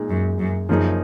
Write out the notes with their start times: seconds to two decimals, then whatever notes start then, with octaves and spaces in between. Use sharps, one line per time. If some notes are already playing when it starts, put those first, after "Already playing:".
Already playing: A#2 G#3 D#4 G#4
0.09 F#2
0.39 F#2
0.69 F#2 C#3 F3 A#3 D#4 G#4